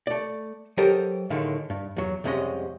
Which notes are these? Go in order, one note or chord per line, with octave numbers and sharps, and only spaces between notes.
A3 D5
F#3 G4 A4 A#4 C5 D#5
C#2 A2 D3 D#3 G#3
G2
E2 F#3
C2 F2 C3 G#3 C#4 D#5